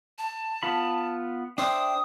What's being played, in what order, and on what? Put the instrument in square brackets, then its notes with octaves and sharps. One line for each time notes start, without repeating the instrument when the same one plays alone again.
[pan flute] A5
[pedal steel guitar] B3 F4 B5
[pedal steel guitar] D4 C5 E5 [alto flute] G5 [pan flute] D#6